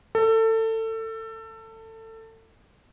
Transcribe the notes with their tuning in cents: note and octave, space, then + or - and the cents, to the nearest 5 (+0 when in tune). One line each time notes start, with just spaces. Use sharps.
A4 +25